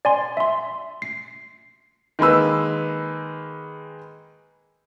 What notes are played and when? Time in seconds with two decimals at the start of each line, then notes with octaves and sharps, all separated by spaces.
0.05 D5 G#5 C6
0.37 E5 C6
1.02 C7
2.19 D#3 G#3 A#3 B4 E6